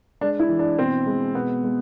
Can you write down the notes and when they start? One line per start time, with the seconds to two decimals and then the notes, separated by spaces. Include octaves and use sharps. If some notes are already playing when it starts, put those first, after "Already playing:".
0.21 G#3 D4
0.39 E4
0.49 E3
0.59 D4
0.78 B2 C4
1.06 G#3
1.35 B2 B3
1.64 G#3